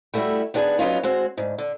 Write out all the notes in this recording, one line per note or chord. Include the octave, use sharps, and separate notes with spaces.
G3 A3 B3 E4 F#4
D#3 B3 D4 G4 G#4 B4
F#3 G3 B3 C#4 D#4 F4
G#3 C4 F#4
D2 G#2
D3